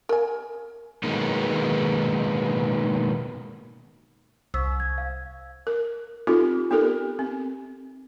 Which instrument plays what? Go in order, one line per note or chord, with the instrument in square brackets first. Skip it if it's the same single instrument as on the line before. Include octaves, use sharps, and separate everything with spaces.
[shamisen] A#4 G#5
[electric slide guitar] B2 D#3 G#3 A#3 B3 D#4
[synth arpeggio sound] C2 [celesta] E6
[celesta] G#6
F5
[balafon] A#4
C4 D#4 F4 G4 A4
B3 D#4 G4 A4 A#4
C4